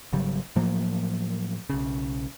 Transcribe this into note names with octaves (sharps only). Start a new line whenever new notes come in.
G#1 C#3 F#3 G3
A2 F3 F#3 A#3
B1 C#3